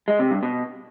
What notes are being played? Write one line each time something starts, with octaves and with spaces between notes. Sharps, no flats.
G#3
C3
G2
B2